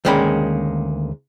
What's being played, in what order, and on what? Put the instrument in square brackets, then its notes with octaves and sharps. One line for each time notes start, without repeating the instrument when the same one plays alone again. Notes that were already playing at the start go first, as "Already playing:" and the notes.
[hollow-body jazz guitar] D2 D#3 G#3 A#3 C#4 B5